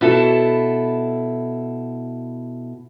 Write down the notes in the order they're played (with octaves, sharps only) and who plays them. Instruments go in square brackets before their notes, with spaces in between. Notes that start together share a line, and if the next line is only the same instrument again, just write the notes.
[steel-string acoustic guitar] B2 E4 A4